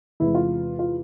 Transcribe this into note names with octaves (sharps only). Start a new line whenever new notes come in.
E2 C3 E3 G#3 E4
F4
F4